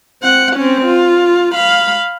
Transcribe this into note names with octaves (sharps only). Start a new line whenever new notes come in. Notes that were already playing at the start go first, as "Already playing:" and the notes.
C4 F#5
C4 C#4
F4
F5 B5